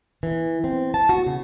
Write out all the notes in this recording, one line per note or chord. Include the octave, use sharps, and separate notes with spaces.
E3
C4
A5
F#4
C#3